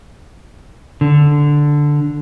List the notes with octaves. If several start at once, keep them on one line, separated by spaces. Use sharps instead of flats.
D3